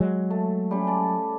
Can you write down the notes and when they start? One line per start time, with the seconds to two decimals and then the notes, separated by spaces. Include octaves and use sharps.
0.01 F#3 G#3
0.30 A3
0.71 G3 C#4
0.87 D5 A5